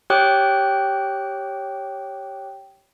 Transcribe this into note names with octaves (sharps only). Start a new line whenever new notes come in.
G4 C#5 G5 D6 D#6 F#6